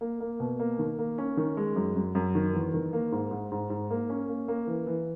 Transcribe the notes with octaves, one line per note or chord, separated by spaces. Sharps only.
A#3
A#3
B2
A#3
D#3
A#3
C#4
D#3
G#3
F#2
F#2
F#2
D#3
E2
D#3
A#3
G#2
G#2
G#2
G#2
A#3
C#4
A#3
A#3
E3
E3